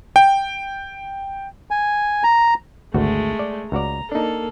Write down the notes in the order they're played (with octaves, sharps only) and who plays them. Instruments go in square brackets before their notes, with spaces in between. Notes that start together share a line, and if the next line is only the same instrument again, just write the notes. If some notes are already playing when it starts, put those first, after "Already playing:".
[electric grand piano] G5
[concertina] G#5
A#5
[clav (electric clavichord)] G#1 D2 F#4 [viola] G#3 A3
[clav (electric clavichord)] D5
[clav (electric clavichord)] C#2 F#4 D5 [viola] A#5
[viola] A#3 A4 [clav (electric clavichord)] D4 D#4